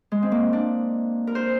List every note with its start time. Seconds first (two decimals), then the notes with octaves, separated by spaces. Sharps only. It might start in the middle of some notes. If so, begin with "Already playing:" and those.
0.12 G#3
0.23 C4
0.32 A#3
0.53 D4
1.27 A#4
1.35 C5